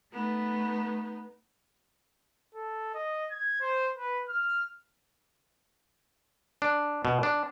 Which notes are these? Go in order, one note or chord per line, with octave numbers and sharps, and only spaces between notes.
A3 B3 D#4
A4
D#5
G#6
C5
B4
F6
D4
B2
D4